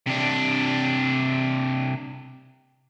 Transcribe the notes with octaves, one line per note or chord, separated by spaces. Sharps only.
C3 D4